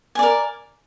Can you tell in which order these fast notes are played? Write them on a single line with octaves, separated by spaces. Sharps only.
G#5 D5 A#4